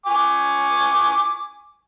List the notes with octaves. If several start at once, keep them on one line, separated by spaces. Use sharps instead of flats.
G#5 C#6 D6